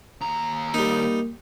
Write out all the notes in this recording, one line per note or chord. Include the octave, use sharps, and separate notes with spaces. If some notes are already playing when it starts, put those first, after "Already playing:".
D#2 A#5
G3 A#3 D#4